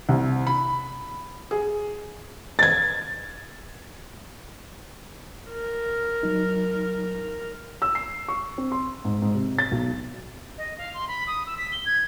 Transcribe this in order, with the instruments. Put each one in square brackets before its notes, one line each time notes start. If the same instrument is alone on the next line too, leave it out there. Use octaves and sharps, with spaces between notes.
[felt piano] C2
B5
G#4
G#6 A6
[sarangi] A#4
[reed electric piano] F#3 D#4
[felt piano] E6
C7
C#6
C4
C6
G#2
G#2
C3
A6
B1
[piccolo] D#5
F5
C6
B5
D#6
E6
B6
G7
G#6